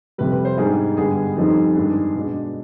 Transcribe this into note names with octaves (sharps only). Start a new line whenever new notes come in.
F2 C3 G3 B4
B4
C5
G#2 G3 B3 D4 G#4
G2 D3 G3 B3 G#4
F2 D#3 G3 C4 D#4
G2 D#3 G#3 D4
B2 G#3 D4